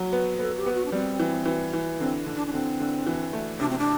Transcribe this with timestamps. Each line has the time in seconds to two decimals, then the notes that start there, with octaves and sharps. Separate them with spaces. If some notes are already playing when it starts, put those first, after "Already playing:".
Already playing: F#3
0.13 B3
0.39 B3 A4
0.57 G4
0.66 B3
0.75 F#4
0.85 D4
0.92 G3 C4
1.20 E3
1.46 E3
1.73 E3
2.00 D3 C4
2.26 D3
2.35 D4
2.47 D4
2.53 D3 C4
2.80 D3
3.07 E3
3.33 A3
3.60 C3 D4
3.70 C4
3.79 D4